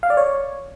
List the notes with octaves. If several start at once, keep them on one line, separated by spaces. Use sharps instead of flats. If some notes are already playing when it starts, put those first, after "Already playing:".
F5
D5
C#5